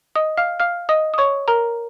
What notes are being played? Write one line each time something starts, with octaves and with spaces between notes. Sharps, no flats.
D#5 D#6
F5 F6
F5 F6
D#5 D#6
D#6
C#5 C#6
A#4 A#5